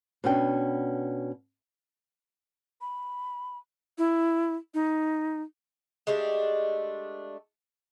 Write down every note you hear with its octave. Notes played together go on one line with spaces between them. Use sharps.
B2 B3 C#4 D4 G5
B5
E4
D#4
G#3 A3 D4 G4